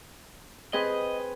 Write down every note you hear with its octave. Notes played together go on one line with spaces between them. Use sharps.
C4 G#4 B4 D#5